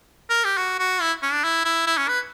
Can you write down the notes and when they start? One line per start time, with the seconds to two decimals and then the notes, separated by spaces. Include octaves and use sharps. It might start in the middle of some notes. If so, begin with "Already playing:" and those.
0.29 A#4
0.44 G4
0.58 F#4
0.79 F#4
1.01 E4
1.22 C#4
1.33 D4
1.44 E4
1.65 E4
1.87 E4
1.97 C#4
2.08 B4